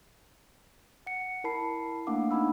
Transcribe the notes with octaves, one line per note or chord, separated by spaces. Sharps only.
F#5 C#7
E4 A#4 A5 B5 C7
A3 A#3 D4 F5 F#5 D6
C4 D4 D#4 F#5 B5 E6